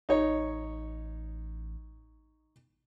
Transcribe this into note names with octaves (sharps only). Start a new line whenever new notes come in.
A1 D#4 C#5